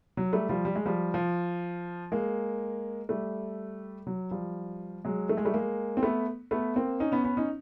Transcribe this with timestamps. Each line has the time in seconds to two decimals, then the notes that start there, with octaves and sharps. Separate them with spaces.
0.17 F#3
0.33 G3 A3
0.49 F3 G3
0.65 G3
0.76 G#3
0.86 F3 G3
1.14 F3
2.12 G#3 A#3
3.09 G3 A3
4.07 F#3
4.31 F3 G3
5.05 F#3 G#3
5.29 A3
5.37 G#3
5.45 G3 A3
5.54 G#3 A#3
5.97 C4
6.03 A3 B3
6.51 A3 B3
6.76 A#3 C4
7.00 C#4 D#4
7.12 B3 C#4
7.24 B3 C#4
7.37 C#4 D#4